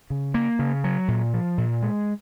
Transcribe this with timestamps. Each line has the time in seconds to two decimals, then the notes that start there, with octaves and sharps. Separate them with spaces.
0.10 C#3
0.34 A#3
0.59 C#3
0.84 F#3
1.08 A#2
1.34 F3
1.58 A#2
1.83 G#3